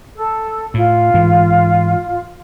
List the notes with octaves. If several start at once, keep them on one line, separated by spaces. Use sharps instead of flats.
A4
A2 F4
G#2 E3